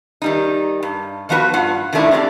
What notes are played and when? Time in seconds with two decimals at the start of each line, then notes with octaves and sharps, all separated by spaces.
0.22 D#3 G3 D#4
0.83 G2
1.29 D#3 F3 B3 F#4 B4
1.54 G2 F4 F#5
1.93 D#3 F3 G#3 A3 D4 E4
2.11 C4 G4 A#4 D5